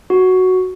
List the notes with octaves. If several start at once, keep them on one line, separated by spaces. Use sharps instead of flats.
F#4